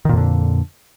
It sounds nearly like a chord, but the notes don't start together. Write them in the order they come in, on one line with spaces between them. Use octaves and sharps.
D#3 A#2 F2 D3